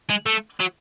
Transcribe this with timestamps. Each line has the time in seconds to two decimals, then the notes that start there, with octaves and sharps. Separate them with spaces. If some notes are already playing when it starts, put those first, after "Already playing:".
0.10 G#3
0.26 A3
0.60 F#3